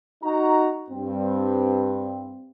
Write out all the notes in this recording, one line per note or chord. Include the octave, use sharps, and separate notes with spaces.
D#4 F#4 A#5
G2 C4